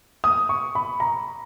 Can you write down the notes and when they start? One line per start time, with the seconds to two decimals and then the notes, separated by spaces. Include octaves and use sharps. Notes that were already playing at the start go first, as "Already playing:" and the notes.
0.24 D#6
0.49 C#6
0.75 B5
1.00 A#5